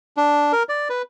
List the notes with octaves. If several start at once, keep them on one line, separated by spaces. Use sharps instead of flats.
D4
A#4
D5
B4